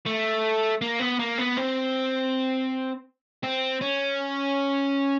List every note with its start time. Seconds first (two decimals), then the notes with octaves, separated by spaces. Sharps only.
0.06 A3
0.81 A#3
1.00 B3
1.20 A#3
1.38 B3
1.57 C4
3.44 C4
3.82 C#4